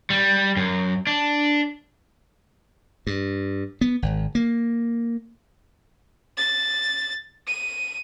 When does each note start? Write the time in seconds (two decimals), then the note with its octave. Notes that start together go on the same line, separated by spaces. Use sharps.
0.10 G3
0.57 F#2
1.07 D4
3.07 G2
3.81 B3
4.02 G#1
4.35 A#3
6.37 A6
7.47 D#7